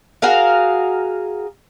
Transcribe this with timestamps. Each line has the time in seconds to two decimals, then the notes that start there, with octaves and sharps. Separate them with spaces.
0.22 F#4 G#4 A#4 F5